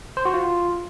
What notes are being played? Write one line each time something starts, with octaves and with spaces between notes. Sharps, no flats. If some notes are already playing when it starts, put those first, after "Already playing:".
C5
F#4
F4